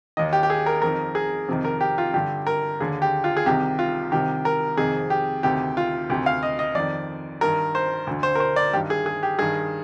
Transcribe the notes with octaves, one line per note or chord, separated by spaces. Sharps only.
D#2 D#3 D#5
G4
G4
G#4
A#4
F2 D#3 A#4
G#4
F2 C3 D#3
A#4
G4
F4
G2 D3 G4
A#4
D#2 D3 G#4
G4
F4
G#4
C2 C3 D#3 G4
F4
C2 C3 D#3 G4
A#4
F2 C3 D#3 G#4
G4
D2 C3 D#3 G4
F4
D2 C3 D#3 G4
F5
D#5
D#5
F2 D#3 D5
G2 D#3 A#4
C5
D2 D3
C5
A#4
C5
D5
G2 D#3 G4
G#4
G#4
G4
G2 D#3 G#4